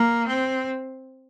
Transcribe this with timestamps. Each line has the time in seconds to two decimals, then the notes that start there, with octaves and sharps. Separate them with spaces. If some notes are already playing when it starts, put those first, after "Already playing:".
Already playing: A#3
0.28 C4